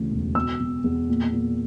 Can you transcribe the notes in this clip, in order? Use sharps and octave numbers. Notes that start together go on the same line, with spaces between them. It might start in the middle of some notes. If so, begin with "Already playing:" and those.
Already playing: D2 C#3 E3
E1
B2 E6
B2
E2
A#2
A#2